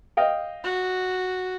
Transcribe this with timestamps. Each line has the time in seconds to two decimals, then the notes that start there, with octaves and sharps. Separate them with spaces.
0.17 D#5 F5 G5
0.64 F#4